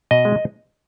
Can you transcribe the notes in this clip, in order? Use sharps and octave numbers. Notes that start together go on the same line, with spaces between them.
B2 D#5
G#3